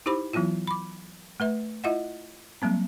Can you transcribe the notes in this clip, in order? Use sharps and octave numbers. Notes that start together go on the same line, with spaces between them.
D#4 E4 G4 C5 B5 D6
E3 F#3 B3 E4 F4
B5 D6
A3 B4 E5
E4 F4 D#5 E5 F#5
F#3 G3 A#3 C4